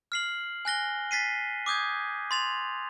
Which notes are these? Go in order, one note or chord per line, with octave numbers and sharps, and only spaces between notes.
F6 C7 F#7
G#5 F#6 A#6 G7
A6 B6 C7 D#7
D6 D#6 G6 G#6
C6 A6 F7